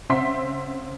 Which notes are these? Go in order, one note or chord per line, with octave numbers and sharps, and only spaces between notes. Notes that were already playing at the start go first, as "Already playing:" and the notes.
C#3 C4 E5 F#5 C6 B6